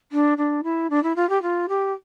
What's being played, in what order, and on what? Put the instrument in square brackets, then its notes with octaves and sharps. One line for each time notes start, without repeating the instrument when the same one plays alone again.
[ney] D4
D4
E4
D4
E4
F4
G4
F4
G4